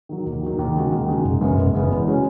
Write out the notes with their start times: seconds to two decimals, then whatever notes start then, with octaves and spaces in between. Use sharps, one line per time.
0.09 D#3 F#3
0.26 D#2
0.42 D#3 F#3
0.59 D#2
0.76 C#3 G#3 D#4 F#4
0.92 D#2
1.08 C#3 G#3 D#4 F#4
1.24 F#1
1.41 F#2 C#3 G#3 B3
1.57 F#1
1.74 F#2 C#3 G#3 B3
1.91 E2
2.07 C#3 G#3 C#4 F#4